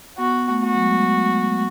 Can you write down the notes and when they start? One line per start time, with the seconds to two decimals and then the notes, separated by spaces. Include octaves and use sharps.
0.18 B3 F#4
0.49 A3
0.63 F#4
0.74 F#3
0.80 G#3